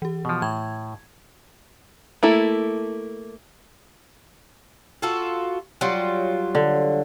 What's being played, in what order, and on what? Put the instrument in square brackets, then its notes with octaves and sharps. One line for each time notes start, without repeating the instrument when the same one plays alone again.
[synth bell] E3 G4
[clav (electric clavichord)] B2 F3
[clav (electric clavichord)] A2 [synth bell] G#6
[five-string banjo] A3 A#3 E4 A4
[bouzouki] F4 F#4 A4
F#3 G3 F4
[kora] D3